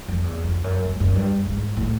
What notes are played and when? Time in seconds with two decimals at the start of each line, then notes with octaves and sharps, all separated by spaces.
0.08 F2
0.24 E2
0.44 F2
0.64 F#2
0.85 F#2
1.00 F#2
1.15 G2
1.46 G#2
1.77 A2